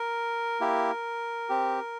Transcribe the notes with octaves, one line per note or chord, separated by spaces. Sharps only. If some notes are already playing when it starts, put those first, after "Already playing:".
Already playing: A#4
A#3 E4 G4
C4 G4